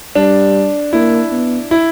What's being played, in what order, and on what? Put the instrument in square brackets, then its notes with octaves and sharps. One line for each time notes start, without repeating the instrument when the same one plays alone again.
[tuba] G3 [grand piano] D4
[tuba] A#3 [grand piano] E4
[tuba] B3
[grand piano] E4